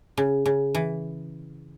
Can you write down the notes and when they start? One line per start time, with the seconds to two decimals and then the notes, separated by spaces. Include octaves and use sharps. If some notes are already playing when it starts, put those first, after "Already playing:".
0.17 C#3
0.46 C#3
0.75 E3